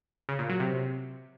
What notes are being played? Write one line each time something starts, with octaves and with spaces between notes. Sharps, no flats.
C#3
A#2
F#3
C3